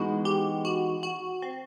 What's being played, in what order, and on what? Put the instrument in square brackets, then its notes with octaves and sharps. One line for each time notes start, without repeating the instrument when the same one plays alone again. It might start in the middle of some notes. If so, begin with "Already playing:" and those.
Already playing: [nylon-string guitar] E3 G#3 B3 D#4 [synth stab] F#4
[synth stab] G4
F#4
F#4
C4